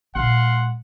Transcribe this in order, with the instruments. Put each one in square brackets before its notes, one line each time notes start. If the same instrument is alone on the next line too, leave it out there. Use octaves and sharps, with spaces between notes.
[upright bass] A#2 G#3 [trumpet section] F5 F#5 C6